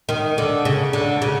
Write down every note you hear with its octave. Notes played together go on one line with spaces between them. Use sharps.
D#3
D3
C#3
D3
C#3